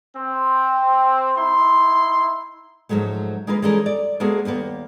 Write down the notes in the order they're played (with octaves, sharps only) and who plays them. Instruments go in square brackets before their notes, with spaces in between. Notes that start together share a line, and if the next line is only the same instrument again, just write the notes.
[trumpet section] C4
D#4 E4 C6
[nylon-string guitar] G#2 F3 F#3 G#3 A3
G#3 A#3 F4 A#4 B4
E3 G3 G#3 C#4 A4 A#4
D5
G#3 A#3 B3 F#4 G#4 A4
D#2 G3 A#3 B3